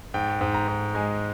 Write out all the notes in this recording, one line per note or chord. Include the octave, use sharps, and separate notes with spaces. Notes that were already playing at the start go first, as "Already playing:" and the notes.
G#2 G5
G#2
A#5
G#2
G#3 G#5